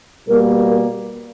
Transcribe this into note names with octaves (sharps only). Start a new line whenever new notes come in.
B2 G3 A#3 A#4
A#4